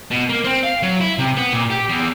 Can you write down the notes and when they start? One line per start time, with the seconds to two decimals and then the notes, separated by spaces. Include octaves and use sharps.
0.11 B2
0.30 A#3
0.45 C4
0.64 F5
0.83 F#3
1.00 E4
1.19 C3
1.37 B3
1.53 A#2
1.70 G4
1.89 E2